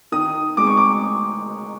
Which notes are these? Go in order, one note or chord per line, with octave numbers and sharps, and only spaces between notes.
D#3 D#6
G#3 C4 D6
C#6
D6